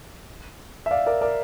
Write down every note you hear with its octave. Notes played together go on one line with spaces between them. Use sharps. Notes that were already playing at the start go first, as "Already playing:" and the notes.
E5
D5 F5
A#4 D5
A#4 D5